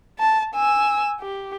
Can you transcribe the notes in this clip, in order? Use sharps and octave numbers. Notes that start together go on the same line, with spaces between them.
A5
G#5 E6
G4